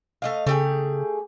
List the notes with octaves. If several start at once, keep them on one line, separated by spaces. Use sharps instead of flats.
A3 D#5 F5
C#3 A3 G4 G#4